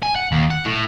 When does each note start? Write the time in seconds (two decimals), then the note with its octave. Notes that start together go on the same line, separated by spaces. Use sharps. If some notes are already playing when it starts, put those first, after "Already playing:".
0.03 G#5
0.16 F#5
0.32 D#2
0.50 F#5
0.65 A2